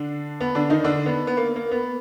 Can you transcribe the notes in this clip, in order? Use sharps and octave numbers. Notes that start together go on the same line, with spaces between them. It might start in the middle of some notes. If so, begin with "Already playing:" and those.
Already playing: D3 D4
B3
D3 D4
D#3 D#4
D3 D4
B3
B3
A#3
A#3
B3